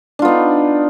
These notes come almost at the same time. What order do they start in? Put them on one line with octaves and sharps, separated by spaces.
D4 F4 B3 D#4